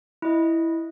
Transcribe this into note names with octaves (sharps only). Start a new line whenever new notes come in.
E4 D#5